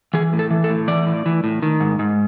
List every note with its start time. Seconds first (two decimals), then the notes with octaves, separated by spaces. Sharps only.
0.14 E3 G#4
0.33 A2
0.39 A4
0.51 E3
0.64 A4
0.70 A2
0.88 E3 D5
1.07 A2
1.26 E3
1.44 A2
1.62 D#3
1.80 G#2
1.99 G#2